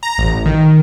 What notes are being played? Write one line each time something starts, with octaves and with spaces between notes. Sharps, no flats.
A#5
A1
D#3